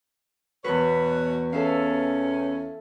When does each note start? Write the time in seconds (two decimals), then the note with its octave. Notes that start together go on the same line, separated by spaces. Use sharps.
0.64 E2 B2 F#4 B4 C#5
1.53 E2 C#4 A4 E5 F5